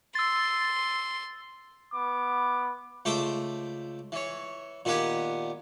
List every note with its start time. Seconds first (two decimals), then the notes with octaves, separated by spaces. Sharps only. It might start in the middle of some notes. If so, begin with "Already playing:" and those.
0.15 C6 E6 A6
1.94 B3 D6
3.05 C#2 A3 A4 C5 G5 D6
4.12 E3 C#5
4.85 A#2 D#3 B3 G4 F#5 G#5